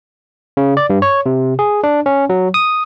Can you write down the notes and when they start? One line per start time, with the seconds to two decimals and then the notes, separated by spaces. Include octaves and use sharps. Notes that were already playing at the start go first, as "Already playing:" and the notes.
0.57 C#3
0.77 D5
0.90 G2
1.02 C#5
1.26 C3
1.59 G#4
1.84 D4
2.06 C#4
2.30 F#3
2.54 D#6